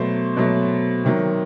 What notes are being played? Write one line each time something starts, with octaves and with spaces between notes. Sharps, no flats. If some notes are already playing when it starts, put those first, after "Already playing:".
Already playing: B2 F#3 A3 C5
B2 F#3 A3
C3 D#3 F#3